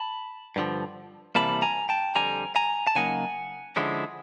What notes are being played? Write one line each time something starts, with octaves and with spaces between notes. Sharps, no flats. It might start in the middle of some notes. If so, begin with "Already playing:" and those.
Already playing: A5 B5
G2 D3 F3
C3 E3 G3 A#3 A5 B5
G#5 A#5
G5 A5
F2 D3 G3 G#5 A#5
G#5 A#5
A5
C#3 F#3 A#3 D#4 F#5 G#5
D3 F3 G#3 C#4 E4